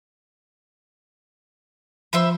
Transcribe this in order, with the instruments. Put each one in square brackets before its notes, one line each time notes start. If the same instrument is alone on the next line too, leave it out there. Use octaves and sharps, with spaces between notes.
[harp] F3 [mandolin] C5 E5 B5